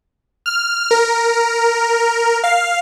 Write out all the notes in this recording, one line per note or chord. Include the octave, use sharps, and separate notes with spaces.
F6
A#4
F5